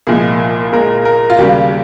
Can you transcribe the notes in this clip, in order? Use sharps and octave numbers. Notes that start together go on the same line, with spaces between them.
C2 A#2 F3 G#3 G#4
A#2 G#3 A#4
A#4
F4
D#2 C#3 G3 A#3 G4